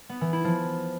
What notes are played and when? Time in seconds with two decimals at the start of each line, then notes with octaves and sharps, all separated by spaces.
0.09 B3
0.21 E3
0.33 E4
0.44 F3